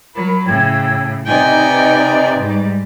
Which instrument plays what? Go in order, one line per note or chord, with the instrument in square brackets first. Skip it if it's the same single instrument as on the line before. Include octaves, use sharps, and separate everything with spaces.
[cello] F#3 [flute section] A#4 B5
[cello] A2 C#3 [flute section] G5 E6 G#6
[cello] C3 D5 [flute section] D#4 B4 D#5 [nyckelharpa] G5 G#5
[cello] G#2 G3